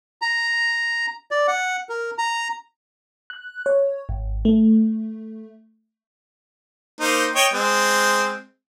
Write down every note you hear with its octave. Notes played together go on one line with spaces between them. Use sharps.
A#5
D5
F#5
A#4
A#5
F#6
C#5
G#1
A3
A#3 D#4 C5
C#5 D#5 G5
G#3 C4